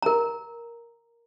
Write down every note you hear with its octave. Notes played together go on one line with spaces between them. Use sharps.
A#4 A#5